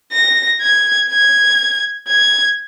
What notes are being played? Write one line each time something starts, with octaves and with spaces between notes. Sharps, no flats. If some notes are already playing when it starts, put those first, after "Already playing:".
A#6
G#6
G#6
G#6